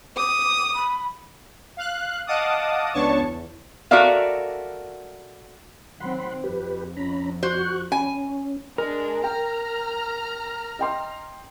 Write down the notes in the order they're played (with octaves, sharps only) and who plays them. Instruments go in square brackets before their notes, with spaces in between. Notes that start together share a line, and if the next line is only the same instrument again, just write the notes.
[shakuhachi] D6 [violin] D#6
[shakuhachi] B5
[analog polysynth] F5 F#6
D#5 F5 F#5 A5 D6 D#6
C#2 B3 D4 C#5 A5 C#6
E2
[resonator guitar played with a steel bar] F#4 A4 A#4 D5 E5 F5
[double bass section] D#3 F#3 C4 [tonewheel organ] F#5 B5 C6
[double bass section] F2 [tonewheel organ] G4 B4
[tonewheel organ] C#4 A#5 B5
[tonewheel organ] F#4 C#6 F#6 [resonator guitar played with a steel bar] C5
[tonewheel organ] C#4 [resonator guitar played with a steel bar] G#5
[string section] G#3 D4 [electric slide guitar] A#4
[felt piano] G5 [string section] A#5 F6
[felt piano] D#5 G5 C6